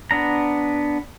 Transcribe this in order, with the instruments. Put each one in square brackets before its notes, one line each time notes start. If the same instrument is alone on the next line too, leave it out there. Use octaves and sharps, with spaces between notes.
[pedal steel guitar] B3 D4 A#5